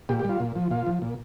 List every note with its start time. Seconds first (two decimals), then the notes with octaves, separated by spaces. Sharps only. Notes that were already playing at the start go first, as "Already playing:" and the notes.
0.09 A#2 G4
0.19 G4
0.25 G3 F4
0.40 A#2
0.56 F3
0.71 A#2 F4
0.86 F3
1.02 A#2